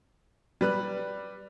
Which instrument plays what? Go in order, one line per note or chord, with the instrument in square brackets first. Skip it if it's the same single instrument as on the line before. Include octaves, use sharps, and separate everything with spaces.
[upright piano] G3 B4 F#6